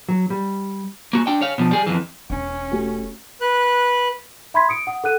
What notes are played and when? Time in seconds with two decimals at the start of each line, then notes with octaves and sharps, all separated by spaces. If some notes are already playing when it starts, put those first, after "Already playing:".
0.09 F#3
0.30 G3
1.13 A#3 F#4
1.27 D4 G5
1.41 C#5 F5
1.58 B2 F3
1.71 G3 G#4
1.87 F2 E3
2.30 E1 C#4
2.72 A3 F#4 G4
3.41 B4 F#6
4.54 E5 B5 C6 G#6 B6
4.69 D#6 C#7 D7
4.87 F#5 D#6
5.04 A4 F#5 F#6 D#7